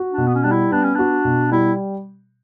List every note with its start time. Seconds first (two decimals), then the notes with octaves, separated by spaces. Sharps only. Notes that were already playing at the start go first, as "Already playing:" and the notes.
Already playing: F#4
0.11 D4
0.18 B2
0.27 B3
0.35 C#4
0.43 G3 D4
0.51 E4
0.71 B3 D4
0.83 C#4
0.95 D4 F#4
1.25 B2
1.51 G3 E4